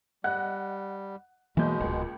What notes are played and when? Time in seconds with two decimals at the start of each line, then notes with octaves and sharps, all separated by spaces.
0.24 G3 D#5 F#5 F#6
1.57 B1 B2 E3 G#3 A#3 G6
1.80 D1 G1 C#2 A#2